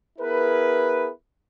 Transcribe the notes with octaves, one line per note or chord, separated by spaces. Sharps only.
B3 E4 G#4 A#4 B4